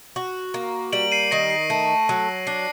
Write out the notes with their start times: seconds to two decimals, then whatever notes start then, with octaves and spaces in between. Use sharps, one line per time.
0.16 F#4
0.54 A#3
0.92 G3 D7 F#7
1.12 C7 D#7
1.31 D#3 A#6 D7
1.50 C7
1.70 A3
2.09 F#3
2.47 D4 C7